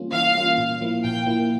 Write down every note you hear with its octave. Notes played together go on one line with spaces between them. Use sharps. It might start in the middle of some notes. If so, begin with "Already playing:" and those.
Already playing: E3 G3 A#3 C#4 F4
E3 F5
G3 A#3 C#4 F4
A#2
F3 A#3 E4
A#2 G5
F3 A#3 E4